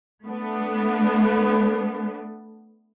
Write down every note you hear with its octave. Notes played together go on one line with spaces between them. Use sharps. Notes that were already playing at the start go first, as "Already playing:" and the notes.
A3 B3 D4